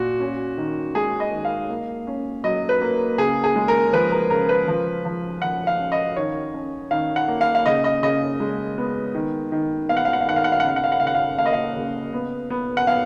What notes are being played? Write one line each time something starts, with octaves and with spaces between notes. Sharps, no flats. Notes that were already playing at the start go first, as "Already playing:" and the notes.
Already playing: A#2 F#4
C#4
D#3
G#3 G#4
D#5
D#3
F5
A#3
C#4
F#3 D#5
B4
A#3
C#3 G#4
G#4
G#3
A#4
F3 B4
A#4
C#3 A#4
B4
F3
F3
F3 F#5
F5
C#4
D#5
D#3 C#5
C#4
D#3 F5
F#5
A#3
F5
F5
C#3 D#5
D#5
C#3 D#5
G#3
B3
D#3
D#3
B3 F5
F#5
F5
F#5
F5
D#3 F#5
F5
F#5
F5
F#5
C#3 F5
F#5
F5
F#5
C#3 F5
F#5
F5
A#3 F5
D#5
F5
C#3
B3
B3
F#5
B3 F5